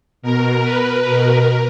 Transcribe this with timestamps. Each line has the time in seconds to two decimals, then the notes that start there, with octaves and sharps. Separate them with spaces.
0.22 B2 A#4
0.63 B4
1.03 B2 A#4